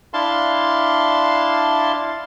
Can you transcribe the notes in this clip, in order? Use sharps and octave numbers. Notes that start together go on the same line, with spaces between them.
D4 E4 F5 A5 C6